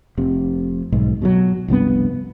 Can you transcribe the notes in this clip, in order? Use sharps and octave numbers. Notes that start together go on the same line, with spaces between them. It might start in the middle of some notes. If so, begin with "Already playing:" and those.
F1 C3
B1 G#2
B2 F3 F#3
F1 C2 G2 B3